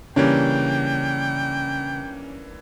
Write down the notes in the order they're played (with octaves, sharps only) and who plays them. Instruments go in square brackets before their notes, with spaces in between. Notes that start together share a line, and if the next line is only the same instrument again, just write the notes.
[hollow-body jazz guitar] C#3 [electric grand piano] E3 A#3 D4 [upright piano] G3 C#4 [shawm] G5